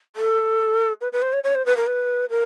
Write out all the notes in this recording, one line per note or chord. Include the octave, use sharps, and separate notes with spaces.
A4
B4
B4
C5
C#5
C#5
C5
B4
A#4
B4
A#4